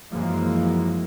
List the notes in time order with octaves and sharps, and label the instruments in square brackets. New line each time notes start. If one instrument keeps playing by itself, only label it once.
[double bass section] F#2 E3 F3 G#3 A#3